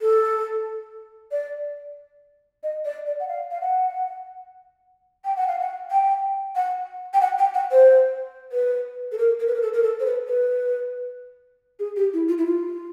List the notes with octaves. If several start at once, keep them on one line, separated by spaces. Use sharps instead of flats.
A4
D5
D#5
D5
D5
F#5
F5
F5
F#5
G5
F#5
F5
F#5
G5
F#5
G5
F#5
G5
F#5
C5
B4
A4
A#4
A#4
B4
A#4
A4
A#4
A4
C5
B4
B4
G#4
G4
E4
F4
E4
F4